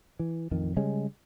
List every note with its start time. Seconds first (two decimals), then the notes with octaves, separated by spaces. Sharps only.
0.19 E3
0.51 A1 F2 D#3
0.76 C#3 G3 G#3 C#4